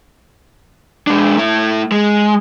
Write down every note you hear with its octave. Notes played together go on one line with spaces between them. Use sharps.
G#3 D4
A3 E4
G#3